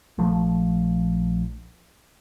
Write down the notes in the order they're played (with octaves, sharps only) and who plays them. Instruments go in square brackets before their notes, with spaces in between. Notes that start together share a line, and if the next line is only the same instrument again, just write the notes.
[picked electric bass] A#1 F3 A3